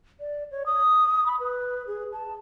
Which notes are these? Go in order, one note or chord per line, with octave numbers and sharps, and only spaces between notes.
D5
C#5
D#6
B5
B4
G#4
A5